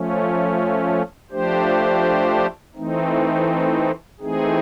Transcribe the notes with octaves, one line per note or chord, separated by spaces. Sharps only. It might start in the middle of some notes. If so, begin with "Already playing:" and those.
Already playing: F3 A3 C#4
F3 A3 D4 G4 C5
E3 A3 C4 D#4
E3 A3 C4 D#4 G#4